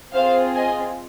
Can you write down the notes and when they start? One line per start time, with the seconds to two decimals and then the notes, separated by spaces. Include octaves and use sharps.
0.13 C4 F4 G#4 C5 F5
0.55 D#5 G#5